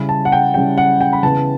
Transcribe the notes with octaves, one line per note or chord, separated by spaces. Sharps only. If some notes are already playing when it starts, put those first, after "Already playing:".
Already playing: C#3 G3 C#4 E4 B5
A5
F#5
G5
C#3 G3 C#4 E4 G5
F#5
G5
B5
C#3 E3 B3 A5